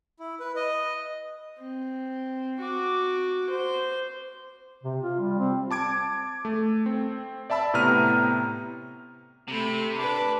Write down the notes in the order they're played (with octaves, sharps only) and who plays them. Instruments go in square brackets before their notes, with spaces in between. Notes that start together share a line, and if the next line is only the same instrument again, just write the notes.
[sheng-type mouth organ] E4
B4
D#5
[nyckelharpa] C4
F#4 D6
C5
[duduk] C3
F4
G3
C4
[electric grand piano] A5 D6 G#6 D7
A3
C4
D5 E5 A5 B5 E6
A2 C3 B3 A#5 F6 D#7
[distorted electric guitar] C3 [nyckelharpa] A3 B5
[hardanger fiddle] D4 B4 [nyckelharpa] D6